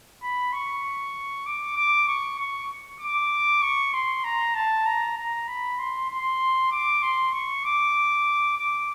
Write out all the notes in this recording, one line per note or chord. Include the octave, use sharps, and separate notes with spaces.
B5
C#6
D6
D6
C#6
C#6
D6
C#6
C6
A#5
A5
A#5
A#5
B5
C6
C6
D6
C6
C#6
D6
D6